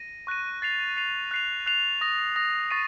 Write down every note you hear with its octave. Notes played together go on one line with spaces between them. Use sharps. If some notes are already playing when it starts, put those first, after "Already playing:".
Already playing: A#6 D#7
C#6 F#6 A#6 D#7
A6 C7 F7
A6 C7 F7
F#6 C7 F7
F#6 C7 F7
D#6 A#6 F7
D#6 A#6 F7
C#6 A6 C7 D#7